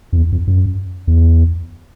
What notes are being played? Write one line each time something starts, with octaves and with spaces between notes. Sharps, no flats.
F2
E2
F2
F#2
E2